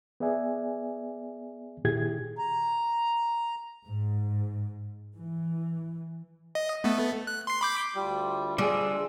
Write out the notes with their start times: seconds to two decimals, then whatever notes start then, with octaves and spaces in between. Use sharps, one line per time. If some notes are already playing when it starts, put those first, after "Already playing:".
0.20 B3 G#4 D5 E5 G#5
1.85 A#2 D#3 E4 G4 G#4 G#6
2.38 A#5
3.85 G#2
5.16 E3
6.55 D#5
6.84 A3 B3
7.27 F#6
7.47 C6 C7
7.61 B5 D6 G6
7.95 D2 G3 F4
8.58 G3 D4 G#4 E6